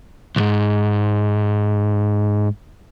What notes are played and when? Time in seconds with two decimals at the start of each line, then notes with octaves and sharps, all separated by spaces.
0.36 C2 G#2